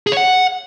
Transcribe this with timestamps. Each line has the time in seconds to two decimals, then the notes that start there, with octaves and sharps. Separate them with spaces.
0.07 G#4
0.12 C#5
0.17 F#5